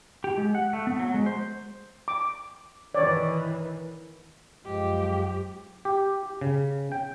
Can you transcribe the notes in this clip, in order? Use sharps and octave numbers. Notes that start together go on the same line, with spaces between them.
G4
G#3
F#5
A3
B3
F#3
G#3
C5
D6
D#3 E3 C#5 D5
F#2 F3 G#3 G4
G4
C#3
G5